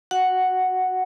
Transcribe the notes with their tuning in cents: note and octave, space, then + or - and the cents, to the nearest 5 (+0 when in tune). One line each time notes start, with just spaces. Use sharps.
F#4 +0 F#5 +0